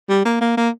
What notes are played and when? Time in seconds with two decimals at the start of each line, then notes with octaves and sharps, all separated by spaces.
0.09 G3
0.25 A#3
0.41 A#3
0.57 A#3